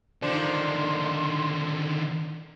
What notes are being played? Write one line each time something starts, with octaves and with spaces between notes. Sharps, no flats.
D3 D#3 F3 D4 C6